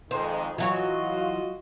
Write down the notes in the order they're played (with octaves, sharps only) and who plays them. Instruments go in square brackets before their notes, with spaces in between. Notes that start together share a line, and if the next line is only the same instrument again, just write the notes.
[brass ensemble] F2 D#3 G#3 [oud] C5
[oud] E3 F#3 C#5 [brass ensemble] F4 F#4 D#5